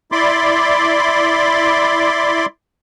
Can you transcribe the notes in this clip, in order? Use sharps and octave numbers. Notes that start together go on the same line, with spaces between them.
E4 D5 B5 C6 D6